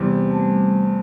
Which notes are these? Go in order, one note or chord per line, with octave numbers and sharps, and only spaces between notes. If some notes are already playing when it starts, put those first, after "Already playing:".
Already playing: E2 C3 G3 C4
A3
G3